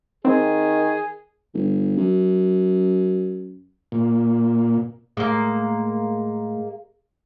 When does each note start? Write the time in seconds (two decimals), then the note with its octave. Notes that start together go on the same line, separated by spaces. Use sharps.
0.25 D#3 C4 G#4
1.54 G1
1.97 F#2
3.92 A#2
5.17 A2 G#3 A#3